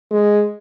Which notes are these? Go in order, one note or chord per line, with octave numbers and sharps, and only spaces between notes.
G#3